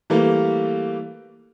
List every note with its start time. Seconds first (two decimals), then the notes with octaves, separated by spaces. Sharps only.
0.10 E3 G3 A3 A#3